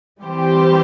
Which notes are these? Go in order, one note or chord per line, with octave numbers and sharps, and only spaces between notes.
E3 G3 C4 G4 C5